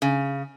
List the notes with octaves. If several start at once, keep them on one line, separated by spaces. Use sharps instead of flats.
C#3